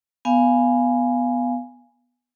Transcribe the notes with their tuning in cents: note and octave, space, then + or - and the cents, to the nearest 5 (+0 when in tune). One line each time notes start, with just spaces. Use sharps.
B3 +0 F5 -10 G#5 +0